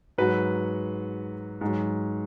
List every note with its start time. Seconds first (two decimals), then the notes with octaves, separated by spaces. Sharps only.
0.18 G#2 F#3 F#4 B4
1.61 G#2 F#3